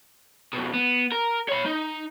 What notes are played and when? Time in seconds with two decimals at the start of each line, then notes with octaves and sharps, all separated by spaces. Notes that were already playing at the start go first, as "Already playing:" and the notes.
0.53 F2 B2
0.73 B3
1.12 A#4
1.49 C#5 B5
1.66 D#4